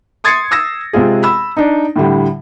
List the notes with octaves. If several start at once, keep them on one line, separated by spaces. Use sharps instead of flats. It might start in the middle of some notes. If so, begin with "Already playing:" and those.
C6 D#6 G#6 A6 C7 C#7
D#6 E6 A#6
C3 G#3 C4 F4 G#4
B5 E6
D4 D#4
A2 D3 G3